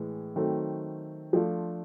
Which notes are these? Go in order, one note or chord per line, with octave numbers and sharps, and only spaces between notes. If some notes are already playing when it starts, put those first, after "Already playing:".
Already playing: A2 E3 G#3
D#3 F#3 A3 C4
F3 A3 D4 F4